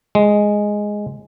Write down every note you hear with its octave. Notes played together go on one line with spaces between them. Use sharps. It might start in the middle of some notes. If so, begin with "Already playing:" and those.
G#3